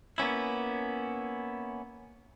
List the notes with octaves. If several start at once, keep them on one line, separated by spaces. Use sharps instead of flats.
A#3 B3 C#4 E4